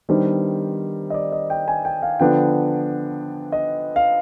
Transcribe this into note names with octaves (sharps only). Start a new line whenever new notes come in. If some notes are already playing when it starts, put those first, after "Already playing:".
D#3 G3 B3 D4 C5
D#5
D5
D#5
G5
G#5
G5
F5
D3 F3 B3 D4 G5
D#5
F5